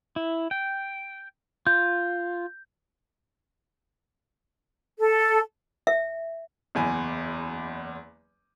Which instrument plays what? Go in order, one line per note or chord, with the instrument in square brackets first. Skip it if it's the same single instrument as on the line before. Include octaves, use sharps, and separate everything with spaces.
[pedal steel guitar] E4
G5
[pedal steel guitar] F4 [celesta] G6
[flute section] A4
[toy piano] E5
[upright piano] F#1 E2 G#5